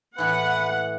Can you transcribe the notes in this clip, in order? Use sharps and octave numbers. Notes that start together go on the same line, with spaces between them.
A2 E3 B4 F#5